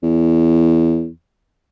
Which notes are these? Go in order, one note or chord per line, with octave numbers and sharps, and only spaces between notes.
E2